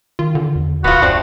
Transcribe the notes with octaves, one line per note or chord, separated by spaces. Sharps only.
D#3 F4
D3
E2
D1 C#2 B3 F4 F#4
F#2 A3 C4 D4